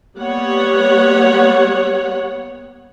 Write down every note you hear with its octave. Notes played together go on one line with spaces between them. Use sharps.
G3 A#3 B3 C#5 F#5